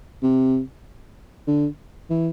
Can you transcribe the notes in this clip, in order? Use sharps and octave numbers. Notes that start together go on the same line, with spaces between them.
C3
D3
E3